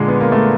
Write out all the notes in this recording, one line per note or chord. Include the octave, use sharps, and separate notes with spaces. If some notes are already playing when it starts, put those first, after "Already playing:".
Already playing: A#2 D3 G#3
B3
A#3
A3